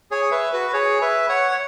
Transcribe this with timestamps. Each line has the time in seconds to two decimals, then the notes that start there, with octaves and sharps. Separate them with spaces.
0.11 G#4 C#5
0.31 B4 E5
0.53 F#4 B4
0.73 G#4 C#5
1.01 B4 E5
1.29 C#5 F#5
1.51 C#5